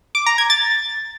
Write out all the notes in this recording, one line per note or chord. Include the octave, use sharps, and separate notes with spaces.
D6
A#5
G#6
A6